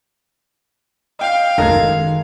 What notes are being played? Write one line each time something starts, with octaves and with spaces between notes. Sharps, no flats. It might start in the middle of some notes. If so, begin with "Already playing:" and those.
D#5 F5 G5
F#2 D#3 G#3 D#4 A4 A#4 G#6